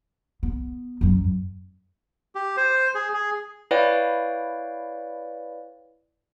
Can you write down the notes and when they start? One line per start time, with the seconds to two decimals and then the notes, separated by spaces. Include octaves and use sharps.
0.43 B3
1.01 F#2 F#3
2.35 G4
2.57 C5
2.95 G#4
3.14 G#4
3.71 E4 B4 C#5 D5 F5 G5